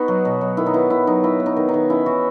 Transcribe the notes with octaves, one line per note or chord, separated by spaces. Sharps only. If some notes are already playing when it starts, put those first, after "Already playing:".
Already playing: B3 D#4 F#4
F#3
B2
F#3
D#3 E4
D#4
B3 E4
D#3 E4
F#3 D#4
F#3 E4
B3
D#4
D#3
D#4
D#3
C#4 E4
E3 F#4